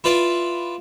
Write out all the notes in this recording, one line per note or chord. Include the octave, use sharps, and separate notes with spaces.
E4 F4 B4 D5